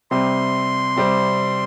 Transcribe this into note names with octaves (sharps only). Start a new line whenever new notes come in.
C3 G3 C4 C6
C3 G3 C4